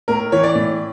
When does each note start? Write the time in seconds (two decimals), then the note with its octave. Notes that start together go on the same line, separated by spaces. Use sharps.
0.08 A2 A#4
0.32 E3 C#5
0.43 D5
0.55 A2